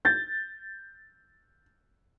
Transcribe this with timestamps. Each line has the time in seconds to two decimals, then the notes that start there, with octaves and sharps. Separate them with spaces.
0.05 G6 A6